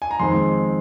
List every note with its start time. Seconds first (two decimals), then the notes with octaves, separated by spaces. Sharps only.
0.02 G#5
0.11 A#5
0.19 F2 D#3 G#3 C4 C6